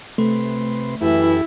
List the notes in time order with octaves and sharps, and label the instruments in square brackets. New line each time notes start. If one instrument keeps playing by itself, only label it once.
[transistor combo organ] C3 B4 C6 [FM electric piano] A3
[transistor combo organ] F#2 G4 A4 [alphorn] E3 [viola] E4